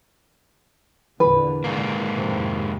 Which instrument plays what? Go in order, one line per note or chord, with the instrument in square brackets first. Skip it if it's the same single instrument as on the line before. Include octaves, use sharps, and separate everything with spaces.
[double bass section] E2 A#2 D3 [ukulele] B4
[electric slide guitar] G#2 A#3
[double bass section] F2 A2 C3